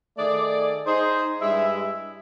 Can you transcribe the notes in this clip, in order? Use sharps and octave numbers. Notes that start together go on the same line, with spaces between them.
D#3 A3 G#4 D5
D#4 G#4 C5
G2 G3 G#3 E4 E5